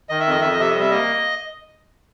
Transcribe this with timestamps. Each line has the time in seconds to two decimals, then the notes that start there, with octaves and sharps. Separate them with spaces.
0.09 D#3 D#5
0.20 E5
0.26 F2 D#5
0.41 F2 E5
0.51 D#5
0.59 C3 E5
0.70 G3 D#5
0.80 E5
0.91 A#3 D#5